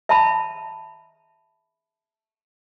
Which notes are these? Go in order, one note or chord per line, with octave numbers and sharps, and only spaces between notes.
E5 A5 B5